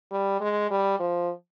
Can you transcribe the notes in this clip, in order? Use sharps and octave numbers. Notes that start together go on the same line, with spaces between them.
G3
G#3
G3
F3